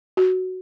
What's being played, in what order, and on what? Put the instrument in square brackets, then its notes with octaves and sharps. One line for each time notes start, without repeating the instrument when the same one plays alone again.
[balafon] F#4